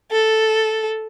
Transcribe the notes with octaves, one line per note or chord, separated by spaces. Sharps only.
A4